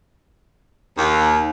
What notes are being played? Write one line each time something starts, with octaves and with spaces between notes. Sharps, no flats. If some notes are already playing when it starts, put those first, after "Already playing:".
D#2